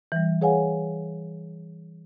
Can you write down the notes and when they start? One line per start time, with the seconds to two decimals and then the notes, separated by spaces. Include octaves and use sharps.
0.12 E3 G3
0.41 G#4 B4 C#5 F5 F#5 G#5